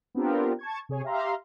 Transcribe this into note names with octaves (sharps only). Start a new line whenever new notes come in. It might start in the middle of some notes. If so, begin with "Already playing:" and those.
B3 C4 D4 F4 G4 A#4
A5 C#6 G#6
C3 G#4 C#5 G#5
G4 E5 F5 A#5 C6